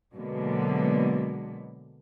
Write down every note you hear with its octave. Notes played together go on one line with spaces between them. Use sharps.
B2 D3 F#3 G#3 A#3 B3